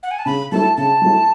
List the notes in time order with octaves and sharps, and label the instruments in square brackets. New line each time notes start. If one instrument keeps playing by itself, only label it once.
[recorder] F#5
G#5
A5
[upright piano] C#3 [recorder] B5
[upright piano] F#3 A3 E4 [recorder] A5
[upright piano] C#3 [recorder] A5
[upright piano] F#3 A3 E4